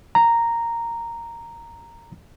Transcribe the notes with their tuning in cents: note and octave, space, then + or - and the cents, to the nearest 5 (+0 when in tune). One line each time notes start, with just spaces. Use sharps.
A#5 -5